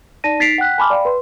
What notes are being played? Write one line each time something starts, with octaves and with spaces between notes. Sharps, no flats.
D#4 D5 A5 A#6 D#7
D#4 A6 B6 C7 D7 F7
F#5 G5 F#6 B6
G#5 A5 B5 C6 D6 F6
D5 F5 G5 B5
B4 C6